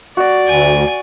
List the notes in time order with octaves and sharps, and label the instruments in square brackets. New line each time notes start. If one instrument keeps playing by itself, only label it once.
[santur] F#4 [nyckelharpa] D5
[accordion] D2 [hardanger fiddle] G#5